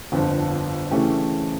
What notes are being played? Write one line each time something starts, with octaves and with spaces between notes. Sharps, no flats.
G1 F2 D3 F3
C#3 E3 A3 C#4 G4